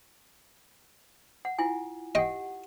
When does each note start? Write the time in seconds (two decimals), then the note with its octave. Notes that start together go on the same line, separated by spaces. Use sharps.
1.45 F#5
1.59 E4 F4 G#5
2.15 G4 D#5 F#5 G5